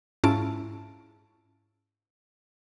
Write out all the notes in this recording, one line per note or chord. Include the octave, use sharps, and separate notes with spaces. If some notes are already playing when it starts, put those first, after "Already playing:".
G#2 C#4 E4 F4 A5 D7